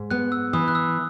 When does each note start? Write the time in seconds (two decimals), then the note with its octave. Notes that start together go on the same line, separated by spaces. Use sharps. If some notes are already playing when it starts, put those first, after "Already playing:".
Already playing: G#2
0.11 B3 F#6
0.32 E6
0.53 E3 D#6
0.68 F#6
0.75 E6